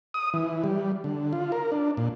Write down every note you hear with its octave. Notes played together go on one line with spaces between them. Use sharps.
D#6
E3
G3
D3
F4
A#4
D4
A#2